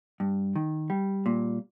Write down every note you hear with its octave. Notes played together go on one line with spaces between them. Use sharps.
G2
D#3
G3
A#2